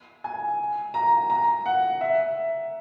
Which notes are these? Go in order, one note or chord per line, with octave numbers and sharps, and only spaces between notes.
G#5
A#5
A#5
F#5
E5